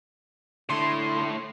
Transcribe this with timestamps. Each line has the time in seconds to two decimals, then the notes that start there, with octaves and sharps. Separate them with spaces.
0.70 A2 D3 A3 E4 C6